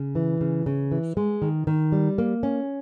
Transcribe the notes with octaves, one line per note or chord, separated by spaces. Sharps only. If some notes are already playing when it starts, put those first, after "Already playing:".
Already playing: C#3
E3
C#3
C#3
E3
G#3
D#3
D#3
G3
A#3
C#4